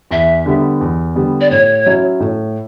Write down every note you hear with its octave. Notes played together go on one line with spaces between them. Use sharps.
E2 E5
D3 G3 B3
E2
D3 G3 B3
D5
A2 C#5
F#3 C#4 E4
A2